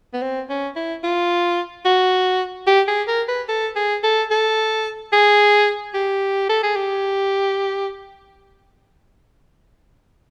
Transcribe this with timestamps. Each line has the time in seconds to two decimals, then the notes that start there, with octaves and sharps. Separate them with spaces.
0.14 B3
0.22 C4
0.49 C#4
0.76 E4
1.04 F4
1.85 F#4
2.67 G4
2.88 G#4
3.08 A#4
3.28 B4
3.49 A4
3.76 G#4
4.04 A4
4.31 A4
5.13 G#4
5.94 G4
6.49 A4
6.63 G#4
6.76 G4